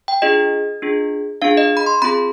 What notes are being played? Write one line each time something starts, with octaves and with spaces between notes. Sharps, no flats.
G5
D4 F4 G#4 D#5
D4 F4 G#4
D4 F4 G#4 F5
D#5
B5
C6
C4 F4 G#4 B5